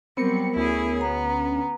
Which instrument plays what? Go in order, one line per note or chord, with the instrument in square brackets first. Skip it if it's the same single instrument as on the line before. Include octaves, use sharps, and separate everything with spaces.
[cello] F#3 G3 [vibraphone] B3 A#4 [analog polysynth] C4 C#7
[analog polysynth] D2 C#4 [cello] E4 G#4
[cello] B3 [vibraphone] A#5